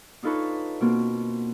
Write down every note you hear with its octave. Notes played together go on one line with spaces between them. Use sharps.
D4 D#4 F4 A4 B4 C#5
B2 A#3 C4